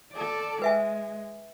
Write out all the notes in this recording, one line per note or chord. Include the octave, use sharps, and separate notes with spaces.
A4 D5
G#3 B4 E5 G#5